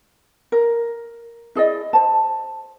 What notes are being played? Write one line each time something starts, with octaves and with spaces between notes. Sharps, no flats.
A#4
E4 G#4 D5 D#5
C5 A5